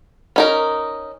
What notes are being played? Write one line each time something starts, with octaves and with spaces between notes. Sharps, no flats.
C#4 D#4 A#4